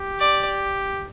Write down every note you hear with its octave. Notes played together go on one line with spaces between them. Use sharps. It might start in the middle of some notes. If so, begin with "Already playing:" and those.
Already playing: G4
D5